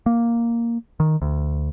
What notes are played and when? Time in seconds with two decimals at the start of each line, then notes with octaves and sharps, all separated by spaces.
0.06 A#3
1.00 D#3
1.22 D2